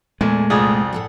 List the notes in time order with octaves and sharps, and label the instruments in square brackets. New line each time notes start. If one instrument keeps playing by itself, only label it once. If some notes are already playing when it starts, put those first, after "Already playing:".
[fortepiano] E2 [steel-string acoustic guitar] A#2 A3 [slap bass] G#3
[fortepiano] C2 F2 [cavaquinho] G#4 D5 D#6
[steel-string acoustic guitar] A2 A4 F#5